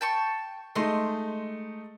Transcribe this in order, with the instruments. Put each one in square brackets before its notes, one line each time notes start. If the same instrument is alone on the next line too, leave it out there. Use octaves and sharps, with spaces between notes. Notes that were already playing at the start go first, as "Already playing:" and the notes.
[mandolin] G5 A5 C#6
[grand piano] G#3 A3 D#4 [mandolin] D#5 C6